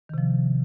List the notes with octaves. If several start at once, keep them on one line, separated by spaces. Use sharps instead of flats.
C3 D#3 F3